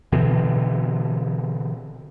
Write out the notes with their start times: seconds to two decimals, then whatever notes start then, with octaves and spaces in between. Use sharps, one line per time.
0.12 B2 D3 E3 C4